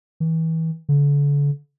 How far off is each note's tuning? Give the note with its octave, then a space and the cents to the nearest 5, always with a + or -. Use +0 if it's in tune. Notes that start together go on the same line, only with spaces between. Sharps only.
E3 -30
D3 -40